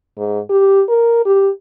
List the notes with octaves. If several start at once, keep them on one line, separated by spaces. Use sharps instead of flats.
G#2
G4
A#4
G4